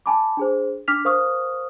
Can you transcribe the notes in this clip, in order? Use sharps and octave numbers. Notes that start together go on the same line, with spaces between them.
G#5 A5 B5 D6
D4 G#4 C5
D4 D6 F6 B6 F7
A#4 C5 F5 C#6 D#6 F6